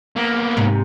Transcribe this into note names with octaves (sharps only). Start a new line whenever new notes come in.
A#3 B3
G#2 C3